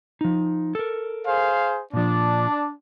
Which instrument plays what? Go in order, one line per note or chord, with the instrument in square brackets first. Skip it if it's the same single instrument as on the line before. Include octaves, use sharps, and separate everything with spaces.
[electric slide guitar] F3 D#4
A4 A#4
[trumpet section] G#4 C5 F5
[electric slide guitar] A#2 F3 [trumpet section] D4